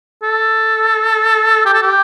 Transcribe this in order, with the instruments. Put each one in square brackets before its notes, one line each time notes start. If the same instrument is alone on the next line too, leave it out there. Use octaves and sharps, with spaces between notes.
[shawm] A4
G4
A4
G4